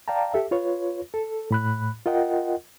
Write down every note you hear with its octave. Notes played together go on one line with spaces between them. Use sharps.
D5 F5 G5 A5 A#5
G4 A4 E5
F4 B4 C#5
A4
A2 B5 F#6
F4 A#4 D#5 F#5 G5